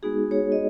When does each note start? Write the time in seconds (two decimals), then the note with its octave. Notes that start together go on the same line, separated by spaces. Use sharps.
0.03 G#3 B3 D#4 F#4 G#4
0.31 G#4 C#5
0.52 D#5